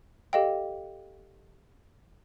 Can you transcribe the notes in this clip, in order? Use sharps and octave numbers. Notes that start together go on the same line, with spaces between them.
G4 A4 D#5 F5 G5